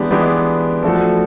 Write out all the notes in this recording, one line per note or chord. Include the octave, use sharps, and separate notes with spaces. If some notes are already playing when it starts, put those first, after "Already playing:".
Already playing: E3 G#3 B3 D4 G4
E3 G#3 B3 D4 G4
F3 A3 D4 F#4 A4